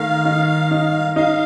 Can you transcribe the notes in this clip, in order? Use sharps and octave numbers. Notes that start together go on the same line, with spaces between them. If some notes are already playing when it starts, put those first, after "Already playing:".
Already playing: D#3 A3 F5
D#4
D#4
D#4 F5